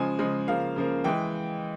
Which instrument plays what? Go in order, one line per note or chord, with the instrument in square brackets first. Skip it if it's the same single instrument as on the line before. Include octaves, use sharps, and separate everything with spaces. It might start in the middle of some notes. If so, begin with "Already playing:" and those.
Already playing: [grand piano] C#3 F3 G#3 G#5
C#3 F3 G#3
C#3 F3 A#3 F5
C#3 F3 A#3
E3 G#3 G5